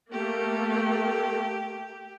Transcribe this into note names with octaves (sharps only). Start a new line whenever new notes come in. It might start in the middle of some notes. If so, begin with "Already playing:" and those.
A3 A#3 G4